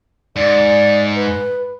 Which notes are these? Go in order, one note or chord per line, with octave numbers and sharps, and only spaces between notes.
G#2 D5
B4